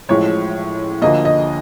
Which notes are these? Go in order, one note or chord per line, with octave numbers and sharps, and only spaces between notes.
A1 A2 F3 G#3 C#5
D2 D3 F3 A#3 D#5
D#5